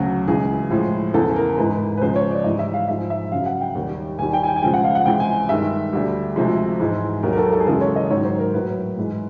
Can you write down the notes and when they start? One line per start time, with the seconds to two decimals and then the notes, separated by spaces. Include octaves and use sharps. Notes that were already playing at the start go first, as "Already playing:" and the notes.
Already playing: D2 C#3 F#3 F#4
0.28 C#2 C#3 E3 G#4
0.70 A2 F3 G#3
1.14 E2 C#3 E3 A4
1.36 A#4
1.58 G#2 E3 G#3 B4
1.98 B4
2.01 C#2 C#3 F3 G#3 C5
2.16 C#5
2.31 D5
2.44 G#2 E3 G3 D#5
2.59 E5
2.74 F5
2.88 G#2 F3 G#3 E5
3.10 E5
3.32 F#2 C#3 F#3 F5
3.46 F#5
3.61 G5
3.75 D#2 D#3 G3
4.19 D#2 D#3 G3 G#5
4.33 G5
4.43 G#5
4.48 G5
4.56 G#5
4.62 C#2 C#3 F3 G#3 G5
4.74 F#5
4.84 F5
4.95 F#5
5.06 C#2 C3 E3 G#3 G5
5.20 G#5
5.49 G2 D#3 G#3 E5
5.93 D2 D3 G3
6.36 D2 C3 F3 G#3
6.80 G#2 E3 G#3
7.23 D#2 D#3 F#3 A#4
7.33 A#4
7.38 A4
7.53 A4
7.60 G#4
7.67 F#2 C#3 E3 G#3 A4
7.81 C#5
7.96 D#5
8.10 G#2 D#3 F#3 C#5
8.25 C5
8.39 A#4
8.54 A2 F#3 B4
8.97 G#2 E3 G#3